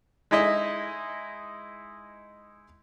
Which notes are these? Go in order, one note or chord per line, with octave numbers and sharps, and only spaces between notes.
G#3 D#4 E4 D#5 E5